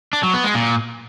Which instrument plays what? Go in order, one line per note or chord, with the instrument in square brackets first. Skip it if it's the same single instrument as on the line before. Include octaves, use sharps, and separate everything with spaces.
[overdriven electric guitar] D4
F#3
B3
G#3
A#2